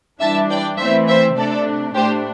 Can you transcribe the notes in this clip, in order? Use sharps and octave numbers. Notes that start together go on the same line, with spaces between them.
E3 G3 D4 E5 A5
D5 G5
E3 A3 C4 C5 E5
C5 E5
C3 A3 D4 A4 D5
A2 A3 D4 G4 C5